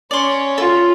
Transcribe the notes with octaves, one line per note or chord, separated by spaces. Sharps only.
C#4 C#5 D5 C6
F4 A4